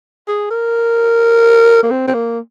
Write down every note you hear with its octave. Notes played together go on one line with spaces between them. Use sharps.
G#4
A#4
A#3
C4
C4
A#3